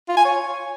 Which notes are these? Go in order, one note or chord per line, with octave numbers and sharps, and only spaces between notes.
F4
G#5
C#5